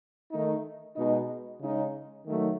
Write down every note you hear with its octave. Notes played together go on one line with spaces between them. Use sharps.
D#3 A3 D#4
B2 G#3 D#4
C#3 G#3 D#4
D#3 F#3 A3